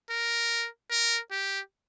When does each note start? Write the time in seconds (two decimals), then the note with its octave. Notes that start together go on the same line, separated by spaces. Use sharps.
0.10 A#4
0.91 A#4
1.31 G4